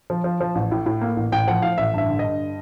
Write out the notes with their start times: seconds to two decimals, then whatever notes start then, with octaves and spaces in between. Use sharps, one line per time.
0.10 F3
0.24 F3
0.41 F3
0.55 A1
0.71 A2
0.86 A2
1.01 A#3
1.16 A1
1.32 A1 G5
1.48 F3 F#5
1.62 A2 F5
1.78 A1 E5
1.94 G2 E5
2.08 D3
2.19 G2 D#5